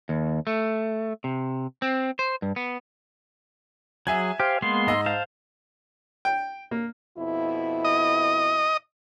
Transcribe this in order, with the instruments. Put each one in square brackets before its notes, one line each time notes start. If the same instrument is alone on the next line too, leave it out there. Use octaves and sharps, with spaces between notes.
[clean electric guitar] D#2
A3
C3
C4
C5
G2
B3
[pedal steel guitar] F#3 G#4 [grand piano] E5 G#5 G#6
[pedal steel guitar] G4 [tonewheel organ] C5 F5
[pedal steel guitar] G#3 A#3 B3 [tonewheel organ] C6
[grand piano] G#2 D#5 E6
[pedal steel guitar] C5 F5 A5
[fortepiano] G5
A#3
[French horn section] F2 B2 E4
[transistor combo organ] D#5